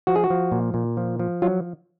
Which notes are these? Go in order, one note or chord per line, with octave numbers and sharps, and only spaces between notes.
F3 F#4
G#4
F#4
F3
A#2
A#2
F3
F3
F#3 F4